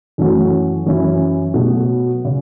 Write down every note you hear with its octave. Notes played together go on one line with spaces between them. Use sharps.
F#2 E3 A3 C#4 F#4
F#2 E3 C#4 E4
B2 F#3 A3 F#4
C#3